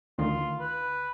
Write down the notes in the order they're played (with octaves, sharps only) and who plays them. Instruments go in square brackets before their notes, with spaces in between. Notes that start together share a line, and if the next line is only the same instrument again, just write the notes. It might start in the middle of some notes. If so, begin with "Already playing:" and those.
[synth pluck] D2 D#3 [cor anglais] F4
[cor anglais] B4